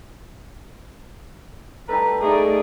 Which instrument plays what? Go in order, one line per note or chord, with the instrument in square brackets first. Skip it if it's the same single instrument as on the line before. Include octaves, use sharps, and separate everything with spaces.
[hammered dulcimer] G3 D#4 A4 [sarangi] B4 [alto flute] A#5
[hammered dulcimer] A3 [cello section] D#4 D5 [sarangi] G#4